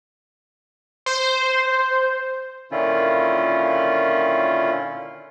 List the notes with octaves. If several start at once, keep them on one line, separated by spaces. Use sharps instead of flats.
C5
A#2 D3 D#3 C#4 E4 F4